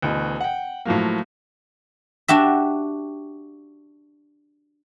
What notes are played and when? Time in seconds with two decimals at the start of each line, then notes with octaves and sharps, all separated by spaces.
0.02 D2 B2 E3
0.41 F#5 G5
0.85 A2 F3 F#3 A#3
2.28 D4 F#4 G4 E5